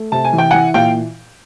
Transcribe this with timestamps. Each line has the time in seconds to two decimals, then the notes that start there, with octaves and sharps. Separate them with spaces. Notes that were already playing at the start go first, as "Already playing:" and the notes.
Already playing: A3
0.12 C3 A5
0.25 G#5
0.33 E3
0.38 G5
0.50 E3 F#5 G#5
0.74 A#2 F5 G5